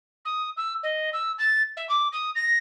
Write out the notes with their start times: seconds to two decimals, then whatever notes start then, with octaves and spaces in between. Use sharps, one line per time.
0.25 D#6
0.56 E6
0.83 D#5
1.12 E6
1.38 A6
1.76 E5
1.89 D6
2.12 D#6
2.35 A#6